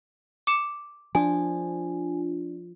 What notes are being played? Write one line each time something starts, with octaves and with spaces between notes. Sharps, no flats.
D6 C#7 E7
F3 D4 G#5